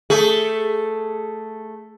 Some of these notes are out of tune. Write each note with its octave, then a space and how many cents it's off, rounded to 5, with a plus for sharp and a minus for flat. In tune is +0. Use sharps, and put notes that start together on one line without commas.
A3 +0 G#4 +10